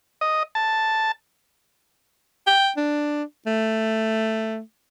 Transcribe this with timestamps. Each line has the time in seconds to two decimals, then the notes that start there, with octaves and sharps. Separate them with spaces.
0.21 D#5
0.55 A5
2.47 G5
2.77 D4
3.46 A3